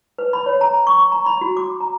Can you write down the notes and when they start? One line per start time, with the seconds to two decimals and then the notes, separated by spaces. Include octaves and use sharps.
0.18 B4
0.33 B5
0.46 C#5
0.61 A#5
0.87 C#6
1.12 A#5
1.26 B5
1.41 F#4
1.57 D6
1.80 A#5